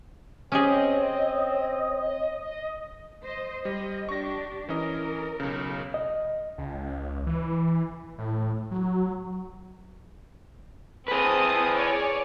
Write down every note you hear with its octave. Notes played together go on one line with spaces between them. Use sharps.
C4 C#4 G4 G#4 C#5 D#5
C5 D#5
G3 D#5
D4 G4 C#6 A#6
E3 C#4 A#4 D#5
B1 C#3
D#5
C#2
C#2
E3
A2
F#3
C4 G#4 B4 A5 D#6
C#5 D5 G#5